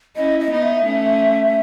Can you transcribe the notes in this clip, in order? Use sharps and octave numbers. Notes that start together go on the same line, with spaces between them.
C#4 E4 D#5
D#5
B3 D#4 D#5
E5
A3 C#4